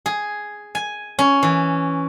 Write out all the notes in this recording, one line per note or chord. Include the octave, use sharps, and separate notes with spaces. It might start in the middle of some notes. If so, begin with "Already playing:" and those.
G#4
G#5
C#4
E3